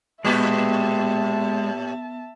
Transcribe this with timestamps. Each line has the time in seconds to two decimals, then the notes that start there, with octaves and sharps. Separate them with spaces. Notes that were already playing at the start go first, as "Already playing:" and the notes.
0.25 A2 G#3 B3 G4 B4 E5 A5